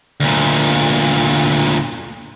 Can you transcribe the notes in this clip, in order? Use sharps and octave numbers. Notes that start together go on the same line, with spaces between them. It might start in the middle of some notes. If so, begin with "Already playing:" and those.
D2 A#2